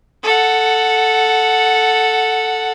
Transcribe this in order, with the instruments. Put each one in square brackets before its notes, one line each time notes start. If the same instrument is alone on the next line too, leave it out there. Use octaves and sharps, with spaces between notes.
[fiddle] A4 F#5